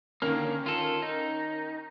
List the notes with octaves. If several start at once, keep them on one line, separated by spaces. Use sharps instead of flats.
D3 D#3 A#3 C#4 F6
F4 A4
D#4